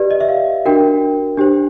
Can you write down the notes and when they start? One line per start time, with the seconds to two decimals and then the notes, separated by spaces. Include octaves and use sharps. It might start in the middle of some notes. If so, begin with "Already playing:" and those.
Already playing: G4 B4 D5
0.11 D#5
0.20 E5
0.29 F5
0.65 D4 F#4 A#4 G5
1.37 D4 G4 C5